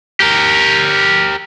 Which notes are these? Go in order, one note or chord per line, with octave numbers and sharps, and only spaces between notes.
G4 A#4